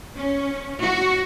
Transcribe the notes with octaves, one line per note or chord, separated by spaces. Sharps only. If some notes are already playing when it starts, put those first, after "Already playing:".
C#4
F#4